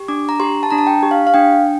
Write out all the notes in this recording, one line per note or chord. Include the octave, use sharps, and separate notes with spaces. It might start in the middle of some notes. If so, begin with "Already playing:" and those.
Already playing: G4
D4 D6
A#5
G4 C6
A5
D4 A#5
A5
G5
G4
F5
F5
D4 G5